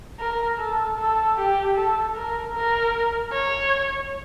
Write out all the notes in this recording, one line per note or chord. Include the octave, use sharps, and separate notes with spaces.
A#4
A4
A4
G4
A4
A#4
A#4
C#5